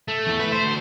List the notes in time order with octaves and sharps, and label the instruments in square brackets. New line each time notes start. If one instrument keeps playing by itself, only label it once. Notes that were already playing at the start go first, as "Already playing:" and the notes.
[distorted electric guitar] A3
[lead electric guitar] E2 E3
B4
[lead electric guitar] A3 [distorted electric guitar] C5
[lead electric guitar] D2